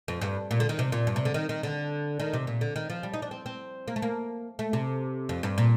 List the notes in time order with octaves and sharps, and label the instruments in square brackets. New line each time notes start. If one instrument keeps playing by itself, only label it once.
[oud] F2
G2
A#2
D3
D#3
C3
A#2
G2
C3
D3
D#3
D#3
D3
D#3
C3
A#2
D3
D#3
F3
G3
D#4
D4
C4
C4
A#3
A3
A#3
A3
C3
F2
G2
A#2